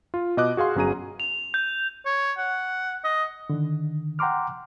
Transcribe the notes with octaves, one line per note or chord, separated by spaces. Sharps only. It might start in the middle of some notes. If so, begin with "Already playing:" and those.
F4
B2 B4 D#5 D6 F#6
F#4 G#4 F5 C6
G1 F#3 C#4 G#4 A#5 D#7
F7
G6
C#5
F#5
D#5
D3 D#3
F#5 G5 A#5 C6 D6 F6